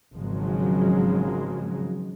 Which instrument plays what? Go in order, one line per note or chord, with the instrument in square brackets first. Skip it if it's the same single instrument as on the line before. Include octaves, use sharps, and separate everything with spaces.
[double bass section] G#1 C#3 F3 F#3 G#3